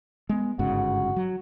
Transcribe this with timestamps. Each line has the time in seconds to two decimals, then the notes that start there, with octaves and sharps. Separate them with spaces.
0.29 G#3 B3
0.59 G1 G#2 C#3 F#4
1.16 F#3